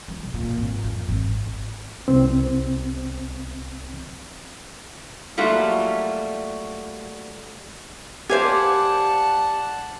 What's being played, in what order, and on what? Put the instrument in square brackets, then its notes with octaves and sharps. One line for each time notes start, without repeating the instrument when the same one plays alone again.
[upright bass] G3
B2
A#2
G#1
F2
G#1
[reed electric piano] C2 C4
[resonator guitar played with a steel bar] F#3 G3 A3 A#3 F4 F#4
[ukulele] G4 C5 [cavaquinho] D5 F5 G#5 [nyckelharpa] F#5 A5